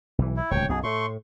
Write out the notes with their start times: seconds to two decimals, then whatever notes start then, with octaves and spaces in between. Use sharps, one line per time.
0.18 B1 E3
0.37 E4
0.51 D1 C#2 C#5 G5 C#6
0.69 B1 F#2 G#4
0.83 A2 A3 C6 C#6